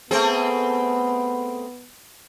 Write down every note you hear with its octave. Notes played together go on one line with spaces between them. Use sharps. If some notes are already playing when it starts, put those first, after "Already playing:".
A3 B3 C4 G#4